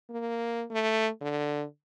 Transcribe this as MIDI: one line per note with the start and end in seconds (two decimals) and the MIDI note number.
0.10 0.65 58
0.72 1.09 57
1.21 1.65 50